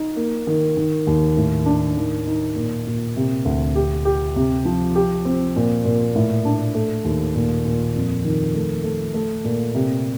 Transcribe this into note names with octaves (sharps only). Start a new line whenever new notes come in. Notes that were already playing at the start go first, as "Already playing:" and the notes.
Already playing: D#4
A#3
D#3
D#3
D#2
A2
D4
D#3
D#4
A#2
A#2
C3
D2
G4
G4
C3
F3
G4
C4
A#2
A#2
A2
D4
A3
D#2
A#2
A#2
F2
D#3
A3
A3
A3
A#2
C3